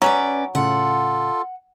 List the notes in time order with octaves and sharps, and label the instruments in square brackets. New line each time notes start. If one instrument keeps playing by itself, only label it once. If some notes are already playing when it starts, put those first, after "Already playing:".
[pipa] F#3 [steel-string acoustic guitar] C#4 B4 D5
[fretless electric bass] A2 C#3 [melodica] F4 A4 [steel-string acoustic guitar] F#5